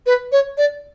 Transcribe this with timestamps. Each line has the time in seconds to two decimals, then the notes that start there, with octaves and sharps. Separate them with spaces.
0.06 B4
0.32 C#5
0.58 D5